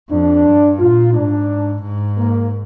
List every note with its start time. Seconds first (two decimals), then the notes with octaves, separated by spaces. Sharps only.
0.10 F2 D4
0.46 G2
0.79 A#2 F4
1.14 G#2 D4
1.83 G#2
2.18 A#3